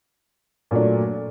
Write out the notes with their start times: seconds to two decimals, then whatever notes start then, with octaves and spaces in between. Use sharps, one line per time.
0.71 A#2 F#3 A3 D4